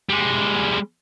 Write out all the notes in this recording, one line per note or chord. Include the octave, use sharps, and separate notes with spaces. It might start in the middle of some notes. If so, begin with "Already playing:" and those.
G3 G#3